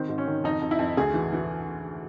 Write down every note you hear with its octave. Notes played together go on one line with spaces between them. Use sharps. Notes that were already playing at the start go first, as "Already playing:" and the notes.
Already playing: D#3 C4
G#2
C#4
D#3
F2 D#4
F2
E4
F2
D2 G#4
E3
E3